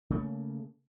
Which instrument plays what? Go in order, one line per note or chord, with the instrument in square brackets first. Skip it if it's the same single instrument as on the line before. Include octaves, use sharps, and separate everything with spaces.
[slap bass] C#3 A3 A#3